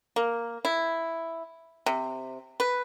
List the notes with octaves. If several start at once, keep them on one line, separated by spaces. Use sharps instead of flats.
A#3
E4
C3
B4